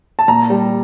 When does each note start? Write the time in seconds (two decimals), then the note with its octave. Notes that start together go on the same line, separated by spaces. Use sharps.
0.19 A5
0.28 A#2 A#5
0.50 G3